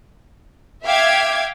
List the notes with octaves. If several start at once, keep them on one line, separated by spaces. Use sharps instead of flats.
E5 F5 G5 D6 G#6